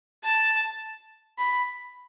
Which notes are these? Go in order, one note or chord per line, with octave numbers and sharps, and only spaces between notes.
A5
B5